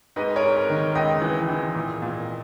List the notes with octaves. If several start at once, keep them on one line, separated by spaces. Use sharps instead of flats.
G#2 B4 D#5
A#4 C#5
G#2
A#4
D#3
A#4
C#2 D#5 G5
E3
E3
A#2
A#2